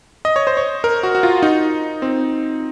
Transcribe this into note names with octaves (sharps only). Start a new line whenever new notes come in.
D#5
C#5
C5
C#5
A#4
F#4
F#4
F4
D#4
C4